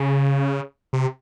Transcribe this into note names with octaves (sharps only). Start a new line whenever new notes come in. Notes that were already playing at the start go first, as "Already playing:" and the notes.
Already playing: C#3
C3